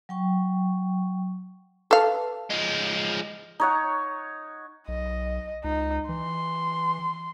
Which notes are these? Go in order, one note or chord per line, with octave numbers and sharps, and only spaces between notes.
F#3 G5 C#6
A4 B4 F5 A5
F3 G#3
D#4 C#5 F#5
B1 D#5
C#2 D#4
E3 C6